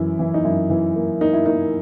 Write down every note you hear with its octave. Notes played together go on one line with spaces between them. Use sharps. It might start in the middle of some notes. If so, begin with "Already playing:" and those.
Already playing: F#2 E3 E4
E3
D#4
F#2 E4
E3
A#3
A#3 D#4
E4
A#3 D#4